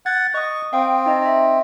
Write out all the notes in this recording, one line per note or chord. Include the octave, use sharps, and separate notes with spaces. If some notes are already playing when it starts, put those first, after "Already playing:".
F#5 G#6 A6
D#5 C#6 D#6
C4 F5 G5 D#6
D#4 D#5
D#5 E5